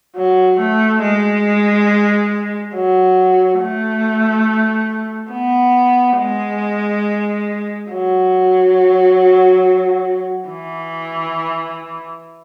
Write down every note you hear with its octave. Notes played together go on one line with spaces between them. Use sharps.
F#3
A3
G#3
F#3
A3
B3
G#3
F#3
E3